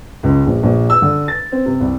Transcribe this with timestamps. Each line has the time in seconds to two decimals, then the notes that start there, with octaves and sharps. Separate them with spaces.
0.23 C#2
0.46 A#1
0.63 A#1
0.90 E6
1.02 D3
1.28 A6
1.52 C4
1.66 C3
1.81 C2